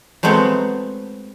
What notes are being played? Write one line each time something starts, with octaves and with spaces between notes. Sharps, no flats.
F#3 G#3 A3 B3 C4 F#5